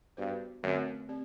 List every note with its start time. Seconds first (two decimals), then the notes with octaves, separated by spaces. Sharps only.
0.17 G2 B3 F#4 C5
0.63 F#2 D3 A3 C4
1.09 C4 G4 D5